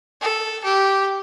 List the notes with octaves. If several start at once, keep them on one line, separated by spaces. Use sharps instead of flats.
A4
G4